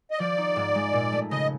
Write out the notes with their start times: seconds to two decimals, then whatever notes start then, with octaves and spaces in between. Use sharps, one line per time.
0.11 D#5
0.19 F3 D5
0.38 D#4
0.56 G#2
0.75 G#3
0.93 A#2
1.13 A3
1.31 C#3 D#5